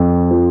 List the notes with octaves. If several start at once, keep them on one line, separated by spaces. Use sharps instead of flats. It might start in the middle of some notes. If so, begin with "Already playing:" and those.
Already playing: F2
F3